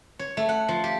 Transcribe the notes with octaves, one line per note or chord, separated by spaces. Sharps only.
C#5
A3
F#5
F3
G4